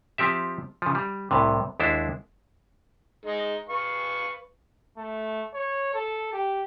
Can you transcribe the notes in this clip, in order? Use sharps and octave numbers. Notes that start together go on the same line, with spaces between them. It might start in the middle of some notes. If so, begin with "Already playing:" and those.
F3 C4 G4 E5
C#3 F3
G3
C2 A2 C3
D#2 G#3 D4 E4 C5
G#3 D#4
B4 F5 C#6
A3
C#5
A4
G4